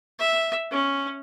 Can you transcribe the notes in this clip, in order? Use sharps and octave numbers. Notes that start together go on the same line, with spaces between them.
E5
C#4